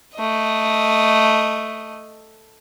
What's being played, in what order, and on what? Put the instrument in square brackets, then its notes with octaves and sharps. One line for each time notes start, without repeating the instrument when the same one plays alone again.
[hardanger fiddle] A3 D#5